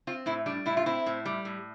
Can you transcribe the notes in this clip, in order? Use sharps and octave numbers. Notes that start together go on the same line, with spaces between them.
C4 F4
A2 E4
G3 D4
A2 E4
F4
C4 E4
A2
G3
A2